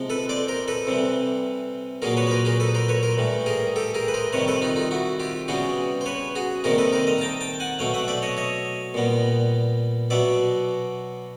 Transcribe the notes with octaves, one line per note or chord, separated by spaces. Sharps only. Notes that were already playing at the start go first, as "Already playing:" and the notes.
Already playing: C3 F3 G#3
A4 B4
C5 D5
A#4 C5
A4 B4
C3 E3 G3
A#2 F#3 A#3 G#4 A#4
B4 C#5
B4
A#4 C5
G#4 A#4
A4 B4
A#4 C5
B4 C#5
A#4 C5
A2 E3 G3
G#4 A#4
G4 A4
G#4 A#4
B4
A#4 C5
C3 D#3 G3 B4 C#5
A4 B4
D#4 F4
D#4 F4
E4 F#4
F4 G4
C#3 E3 G3 B3 F#4 G#4
C5
B4 C#5
F#4 G#4
C3 D#3 G3 A#3 G#4 A#4
A4 B4
A#4 C5
D#5 F5
A#5
G5 A5
G5 A5
F#5 G#5
B2 F#3 A3 F5 G5
E5 F#5
D5 E5
C#5 D#5
C#5 D#5
A#2 G3 B3
B2 F#3 B3 D5 E5